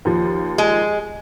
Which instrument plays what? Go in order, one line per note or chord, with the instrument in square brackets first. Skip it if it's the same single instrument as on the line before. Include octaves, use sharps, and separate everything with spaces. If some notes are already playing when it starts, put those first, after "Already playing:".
[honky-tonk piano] D#2 F3
[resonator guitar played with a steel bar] G#3